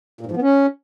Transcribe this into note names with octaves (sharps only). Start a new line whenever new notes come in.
A#2
G#2
F3
B3
C#4